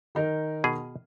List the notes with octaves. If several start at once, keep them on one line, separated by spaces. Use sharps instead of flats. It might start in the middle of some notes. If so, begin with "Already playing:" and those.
D#3 D#4 A#4
B2 G#4